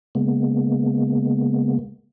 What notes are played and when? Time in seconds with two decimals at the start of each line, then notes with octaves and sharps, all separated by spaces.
0.15 C#3 G#3 A#3 B3